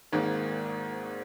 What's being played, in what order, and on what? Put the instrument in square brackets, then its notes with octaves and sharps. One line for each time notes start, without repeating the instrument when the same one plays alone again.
[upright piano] G#1 G#2 D#3 A#3